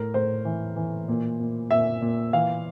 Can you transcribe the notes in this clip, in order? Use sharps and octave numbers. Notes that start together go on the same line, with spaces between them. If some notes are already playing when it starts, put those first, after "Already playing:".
Already playing: A2 A#4
A2 C5
E3
E3
A#2
A#2
A#2 E5
A#2
E3 F5